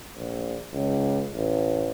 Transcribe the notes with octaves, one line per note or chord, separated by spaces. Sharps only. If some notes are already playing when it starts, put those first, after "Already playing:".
A#1
C#2
A1